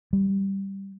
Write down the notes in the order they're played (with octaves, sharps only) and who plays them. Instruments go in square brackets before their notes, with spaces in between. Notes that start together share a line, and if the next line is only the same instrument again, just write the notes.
[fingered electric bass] G3